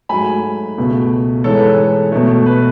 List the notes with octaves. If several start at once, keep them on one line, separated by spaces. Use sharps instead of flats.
G#2 F#3 A3 G#5 B5
C#2 B2 A3
G#2 E3 G#3 A4 C#5
B4
A4
B2 A3
B4